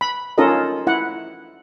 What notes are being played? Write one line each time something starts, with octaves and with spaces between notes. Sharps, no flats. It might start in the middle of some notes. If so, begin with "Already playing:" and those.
B5
C#4 D#4 F4 A4 A#4 D#5
E4 F#5